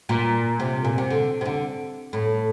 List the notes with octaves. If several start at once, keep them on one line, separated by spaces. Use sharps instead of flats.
A#2
C3
A#2
C3
D3
C3
D3
A2